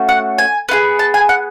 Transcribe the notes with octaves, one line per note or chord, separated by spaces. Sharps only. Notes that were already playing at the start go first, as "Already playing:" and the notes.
Already playing: A3 C#4 F#4
F#5
G#5
B3 F4 G#4
A5
G#5
F#5